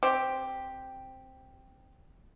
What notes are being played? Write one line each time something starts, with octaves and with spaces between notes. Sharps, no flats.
C4 G4